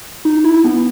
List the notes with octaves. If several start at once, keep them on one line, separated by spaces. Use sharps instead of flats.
D#4
E4
B3